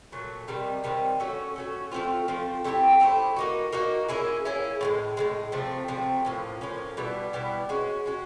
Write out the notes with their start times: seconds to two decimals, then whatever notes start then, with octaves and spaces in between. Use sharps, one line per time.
0.12 A#2 F#3 A3
0.48 C3 D#3 G3 C4
0.84 C3 D#3 G3 C4
1.20 A3 C#4 F#4
1.56 A3 C#4 F#4
1.91 F3 A3 C4 F4
2.28 F3 A3 C4 F4
2.64 A3 C4 E4 G4
3.00 A3 C4 E4 G4
3.36 A#3 D#4 F#4
3.72 A#3 D#4 F#4
4.09 A#3 C#4 E4 G#4
4.45 A#3 C#4 E4 G#4
4.81 A2 F3 G#3
5.17 A2 F3 G#3
5.52 C3 F3 A3 C4
5.88 C3 F3 A3 C4
6.25 A2 F3 A#3 C#4
6.61 A2 F3 A#3 C#4
6.97 B2 G3 B3 E4
7.33 B2 G3 B3 E4
7.69 G#3 C#4 F#4
8.06 G#3 C#4 F#4